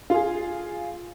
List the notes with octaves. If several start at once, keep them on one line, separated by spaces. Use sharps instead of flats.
F4 G#4